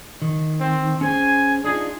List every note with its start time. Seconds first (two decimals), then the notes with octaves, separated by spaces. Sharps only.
0.22 D#3
0.60 C4
1.01 C#4 G#4 C5 G#5
1.64 D4 D#4 F4 G#4